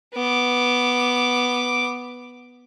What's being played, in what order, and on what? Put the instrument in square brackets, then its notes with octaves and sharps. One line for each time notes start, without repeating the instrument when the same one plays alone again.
[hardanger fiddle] B3 D6